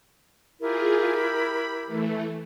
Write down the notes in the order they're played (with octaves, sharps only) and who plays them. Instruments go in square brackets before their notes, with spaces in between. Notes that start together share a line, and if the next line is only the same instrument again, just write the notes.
[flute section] E4 G4 A#4 [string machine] F4 G#4
[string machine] B5
E3 A3